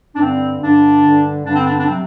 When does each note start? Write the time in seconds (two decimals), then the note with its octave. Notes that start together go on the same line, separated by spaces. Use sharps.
0.15 D4
0.19 G2 D3 G3 C4
0.61 G2 D3 G3 D4
1.04 G2 D3 G3
1.45 G2 D3 G3 D4
1.55 C4
1.67 D4
1.72 C4
1.77 D4
1.87 C3 F#3 C4